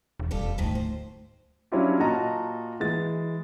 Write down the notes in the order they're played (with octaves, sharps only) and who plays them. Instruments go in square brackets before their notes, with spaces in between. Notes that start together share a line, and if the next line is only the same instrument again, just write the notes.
[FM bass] E1
[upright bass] F2 C3 [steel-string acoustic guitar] G3 F4 A4
[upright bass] D2 [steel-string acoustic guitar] G#2 D#3 F3
[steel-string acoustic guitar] C5
[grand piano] F#3 C#4 D4 E4 F4 G4
A#2 F#4 D#5 A5 A#5
E3 G#3 A6